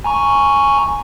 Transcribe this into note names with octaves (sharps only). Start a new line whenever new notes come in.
G#5 A#5 C#6